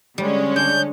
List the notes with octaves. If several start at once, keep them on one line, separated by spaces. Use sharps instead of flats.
D3 G3 G#3 C#4
D4 G6